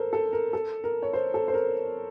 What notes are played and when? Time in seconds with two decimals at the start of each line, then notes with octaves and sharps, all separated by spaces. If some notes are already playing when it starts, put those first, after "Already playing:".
Already playing: A4 A#4 C5
0.13 A4
0.33 A#4
0.53 A4
0.84 A#4
1.03 C#5
1.13 C5
1.34 A4
1.48 C5
1.54 A#4